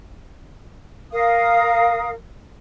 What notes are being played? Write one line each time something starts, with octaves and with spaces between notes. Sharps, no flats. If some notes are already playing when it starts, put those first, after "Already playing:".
A#4 F5 D#6